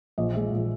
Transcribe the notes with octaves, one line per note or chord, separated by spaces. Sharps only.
A#1 D#5
A#2 G#3 E5
A#1